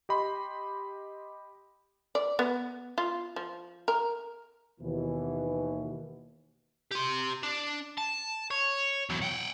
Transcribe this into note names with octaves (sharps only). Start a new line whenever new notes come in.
G4 D#5 B5 C6
D5
B3
F4
F3
A#4
D#2 B2 E3
G4 C6
D4
A5
C#5
E2 F#3
F#5 G5